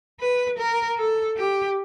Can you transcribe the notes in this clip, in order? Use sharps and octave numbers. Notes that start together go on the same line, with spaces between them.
B4
A#4
A4
G4